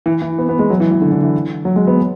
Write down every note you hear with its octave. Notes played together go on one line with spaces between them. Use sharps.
E3
E3
B3
B3
G#3
F#3
E3
E3
D3
D3
E3
F#3
G#3
B3